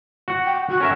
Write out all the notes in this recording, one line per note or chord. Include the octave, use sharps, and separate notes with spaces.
F#4 F#5
G5
F#4
C#4 A#4 E5